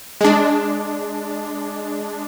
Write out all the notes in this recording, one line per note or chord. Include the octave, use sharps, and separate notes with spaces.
G#3 D4